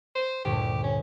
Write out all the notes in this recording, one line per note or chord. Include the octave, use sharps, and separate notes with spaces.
C5
D2 G2 A#2 G4
C#4